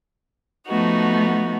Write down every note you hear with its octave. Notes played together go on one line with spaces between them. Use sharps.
F3 A3 B3 D#4 F#4